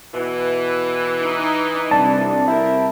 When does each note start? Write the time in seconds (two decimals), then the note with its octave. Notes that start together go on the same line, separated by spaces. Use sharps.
0.14 B2 E3
1.24 D#4
1.91 C2 D4 A5
2.48 A3 C4 E4 A#4